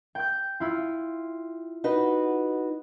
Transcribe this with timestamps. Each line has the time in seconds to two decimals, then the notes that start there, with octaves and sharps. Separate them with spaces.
0.15 G5 G6
0.60 E4 F4
1.84 D#4 F#4 B4